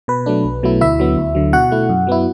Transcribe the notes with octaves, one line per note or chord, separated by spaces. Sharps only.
B2 B4
F#3 A3 D4
B1
B2 F#3 A3 E4
D2 E4 E5
D3 F#3 B3
D2
D3 F#3
B2 F#4 F#5
A3 E4
F#2
F#3 B3 E4